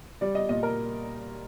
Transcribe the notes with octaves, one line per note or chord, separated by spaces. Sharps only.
G3 D5
D#5
A#2 D#5
A#4